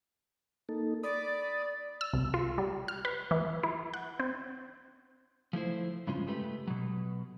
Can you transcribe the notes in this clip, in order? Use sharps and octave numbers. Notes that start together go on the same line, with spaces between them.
A#3 D#4 A4
D5 B5 D#6
E6
C2
F4
G3
F6
B4
E3
E4
F#5
C4
F3 A3 E4 C5
G2 C#3 G#3 C#4 F4
G#3 A3 G4 B4
B2 F#3